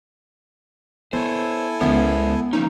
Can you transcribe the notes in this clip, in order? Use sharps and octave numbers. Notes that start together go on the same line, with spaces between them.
B3 E4 A4 C5 C#5 G#5
C#2 G#3 B3 A#4 C5 E5
F3 A#3 C#4 D#4